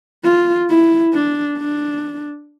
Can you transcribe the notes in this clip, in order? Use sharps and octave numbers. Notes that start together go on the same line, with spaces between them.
F4
E4
D4
D4